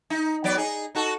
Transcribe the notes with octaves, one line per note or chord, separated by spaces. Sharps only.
D#4
F#3 B3 D5
D#4 G#4
D#4 F#4 A4